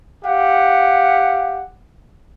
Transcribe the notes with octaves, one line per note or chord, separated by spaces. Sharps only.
G4 F5 F#5